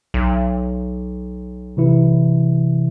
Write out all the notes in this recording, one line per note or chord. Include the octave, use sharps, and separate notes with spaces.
B1
C3 E3 E4